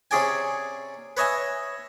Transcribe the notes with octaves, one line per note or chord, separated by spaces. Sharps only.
C3 C#4 G#4 D5 G5 G#5
B4 C#5 D#5 E5 G#5